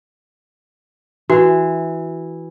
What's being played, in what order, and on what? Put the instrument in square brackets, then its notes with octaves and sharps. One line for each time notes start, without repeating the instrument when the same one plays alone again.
[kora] E3 [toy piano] F#4